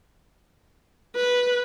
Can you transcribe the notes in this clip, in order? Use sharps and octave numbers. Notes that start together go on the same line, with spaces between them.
B4